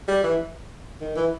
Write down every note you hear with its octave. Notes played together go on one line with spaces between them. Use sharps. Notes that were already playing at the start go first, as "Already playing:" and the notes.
G3
E3
D#3
E3